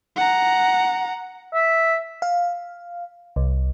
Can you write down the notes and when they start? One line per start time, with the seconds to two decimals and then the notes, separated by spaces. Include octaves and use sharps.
0.16 F#5 A#5
1.54 E5
2.22 F5
3.36 C2